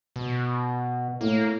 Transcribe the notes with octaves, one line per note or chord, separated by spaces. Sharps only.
B2
A2 A#3